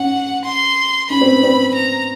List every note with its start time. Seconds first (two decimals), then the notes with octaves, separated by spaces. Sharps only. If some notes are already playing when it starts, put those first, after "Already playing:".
Already playing: C#4 F#5
0.44 C6
1.10 C#4 B5
1.21 C4
1.32 B3
1.43 C4
1.74 A#5